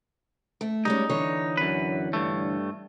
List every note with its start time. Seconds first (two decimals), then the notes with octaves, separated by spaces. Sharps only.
0.61 A3
0.85 G3 G#3 C#4 D#4
1.09 D3 E3 C#5
1.57 F#2 B4
2.13 G2 A3